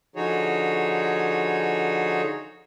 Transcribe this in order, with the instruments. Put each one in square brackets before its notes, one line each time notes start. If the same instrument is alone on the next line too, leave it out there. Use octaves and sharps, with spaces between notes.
[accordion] D3 F3 D#4 F#4 G#4 C#5